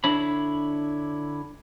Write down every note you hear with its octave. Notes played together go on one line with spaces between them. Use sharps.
D3 D4 E4 C#5 B5